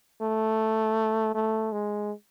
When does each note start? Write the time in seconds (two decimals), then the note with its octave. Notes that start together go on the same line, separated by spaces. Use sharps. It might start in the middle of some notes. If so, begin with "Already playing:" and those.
0.22 A3
1.35 A3
1.72 G#3